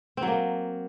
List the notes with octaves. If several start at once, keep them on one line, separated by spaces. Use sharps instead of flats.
C4
F#3
A#3